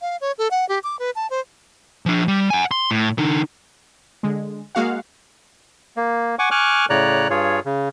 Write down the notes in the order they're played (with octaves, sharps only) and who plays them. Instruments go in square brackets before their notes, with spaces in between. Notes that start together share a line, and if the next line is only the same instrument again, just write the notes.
[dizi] F5
C#5
A4
F#5
G4
D6
B4
A5
C5
[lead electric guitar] F3 D4
G3
F#5 G#5
C6
A2
D3 D#4
[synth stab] D3 G#3
G#3 A#3 F#4 F5 F#5
[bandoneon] A#3
F#5 G#5 C#6 D6
G#5 C#6 D6 F6 F#6
A2 C#3 C#5 D5 A#5 F#6
G2 F4 G#4 C#5
C#3